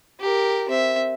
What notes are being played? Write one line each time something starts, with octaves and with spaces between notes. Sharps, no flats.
G4 A#4
C4 E5